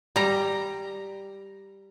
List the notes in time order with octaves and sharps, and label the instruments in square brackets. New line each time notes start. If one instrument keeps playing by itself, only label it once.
[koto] G3 A#5